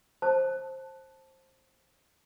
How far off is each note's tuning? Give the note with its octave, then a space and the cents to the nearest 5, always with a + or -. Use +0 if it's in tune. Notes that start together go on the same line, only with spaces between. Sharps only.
C5 +15 A5 +0